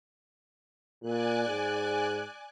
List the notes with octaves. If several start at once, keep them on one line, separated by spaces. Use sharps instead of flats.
A#2 D5 G#5 F#6
G#2